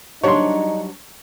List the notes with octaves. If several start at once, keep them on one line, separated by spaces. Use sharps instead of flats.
F#3 G3 D4 D#4 C#5 C6